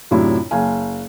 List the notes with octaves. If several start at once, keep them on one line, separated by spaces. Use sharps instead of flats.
F#2 A2 C3 D4 E4 F4
F#1 F5 G#5